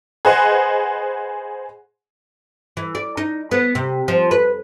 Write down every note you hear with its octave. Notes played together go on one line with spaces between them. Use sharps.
G#4 B4 C5 D#5 F#5 G#5
E3
D5
D#4
B3
C3
F3
B4